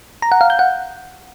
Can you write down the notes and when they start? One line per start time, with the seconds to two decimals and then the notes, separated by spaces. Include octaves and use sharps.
0.22 A#5
0.32 F#5
0.41 F5
0.50 G6
0.59 F#5